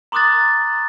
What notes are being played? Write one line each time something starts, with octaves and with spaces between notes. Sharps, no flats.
A#5 C6 D6 D#6 F#6 A6